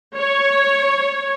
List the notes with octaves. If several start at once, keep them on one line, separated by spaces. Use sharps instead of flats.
C#5